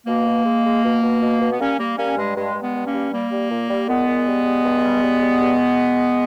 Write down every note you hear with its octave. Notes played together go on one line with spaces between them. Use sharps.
B2 A#3
B2
G#3
G#3
B2
B2
B2
B2
B3
G3 A#3 C#4
G3 A#3
G3 A#3 C#4
G2 G#3
G2 G#3
G2
G#3 B3
G2
A#3 C#4
G3
G3 A#3
G3
A#2
G3
A#2 G#3 B3
A#2
G3
G3
G2
G3
G3
G3
G2